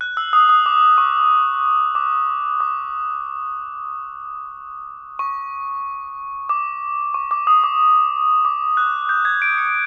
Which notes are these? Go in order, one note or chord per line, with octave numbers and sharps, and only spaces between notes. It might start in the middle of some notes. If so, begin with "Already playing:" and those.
F#6
E6
D#6
D#6
D6
C#6
D6
D6
C#6
D6
C#6
D6
D#6
D6
D6
F#6
G6
G#6
D7
C#7